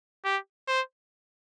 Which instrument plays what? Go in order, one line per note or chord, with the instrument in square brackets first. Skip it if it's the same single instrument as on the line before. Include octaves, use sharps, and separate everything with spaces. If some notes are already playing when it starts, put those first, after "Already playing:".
[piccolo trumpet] G4
C5